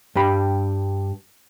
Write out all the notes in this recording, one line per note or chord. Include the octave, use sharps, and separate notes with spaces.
G2 G3 B5